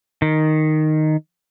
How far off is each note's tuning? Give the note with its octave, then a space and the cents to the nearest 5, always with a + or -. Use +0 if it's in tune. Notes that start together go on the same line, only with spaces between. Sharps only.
D#3 -5